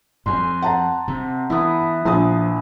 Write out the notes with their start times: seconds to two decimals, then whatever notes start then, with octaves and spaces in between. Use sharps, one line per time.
0.26 F2 G#5 C6
0.62 F#5 A5 A#5
1.08 C3
1.50 E3 B3 E4
2.05 A#1 F3 D#6